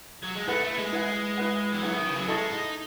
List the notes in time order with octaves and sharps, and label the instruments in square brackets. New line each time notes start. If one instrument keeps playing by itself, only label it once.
[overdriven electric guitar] F#3
G#3
[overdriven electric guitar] A3 [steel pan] E4 B4 F#5
[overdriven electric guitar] A3
G#3
[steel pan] E4 B4 F#5
E4 B4 F#5
[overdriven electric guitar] E3
[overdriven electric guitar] F#3 [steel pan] E4 B4 F#5
[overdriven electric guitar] D#3
C#3
F#3
[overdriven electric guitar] G#3 [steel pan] E4 A4 D#5 A5 C#6
[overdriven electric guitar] D#4